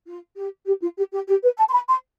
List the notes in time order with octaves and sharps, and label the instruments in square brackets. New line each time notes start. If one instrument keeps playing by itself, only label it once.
[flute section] F4
G4
G4
F4
G4
G4
G4
B4
A5
C6
B5
C6